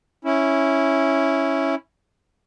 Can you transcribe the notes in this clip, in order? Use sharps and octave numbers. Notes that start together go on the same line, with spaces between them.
C#4 E4